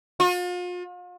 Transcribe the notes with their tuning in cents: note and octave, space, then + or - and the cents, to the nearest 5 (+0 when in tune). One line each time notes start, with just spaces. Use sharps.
F4 +40